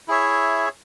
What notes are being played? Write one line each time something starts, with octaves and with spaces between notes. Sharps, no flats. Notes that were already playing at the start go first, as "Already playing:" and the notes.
E4 G#4 C#5 E5